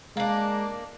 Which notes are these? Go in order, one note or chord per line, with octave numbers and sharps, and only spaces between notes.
G#3 A#3 D4